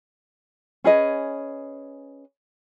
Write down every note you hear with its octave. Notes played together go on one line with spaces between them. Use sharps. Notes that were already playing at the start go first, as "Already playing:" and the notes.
C#4 G#4 B4 D#5